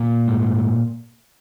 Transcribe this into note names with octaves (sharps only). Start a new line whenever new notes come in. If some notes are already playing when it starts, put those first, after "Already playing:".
Already playing: A#2
G#2